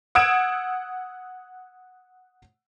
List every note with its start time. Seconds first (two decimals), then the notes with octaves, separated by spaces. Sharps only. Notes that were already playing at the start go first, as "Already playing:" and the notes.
0.15 F#5 D#6 E6 G#6 D7 E7